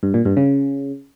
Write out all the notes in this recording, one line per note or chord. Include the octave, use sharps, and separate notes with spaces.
G2
A#2
G2
C#3